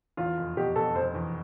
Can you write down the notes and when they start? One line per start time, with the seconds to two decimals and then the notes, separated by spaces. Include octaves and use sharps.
0.17 E2 F4
0.37 F1
0.57 B2 G4
0.76 B2 A4
0.95 F1 C5
1.15 E2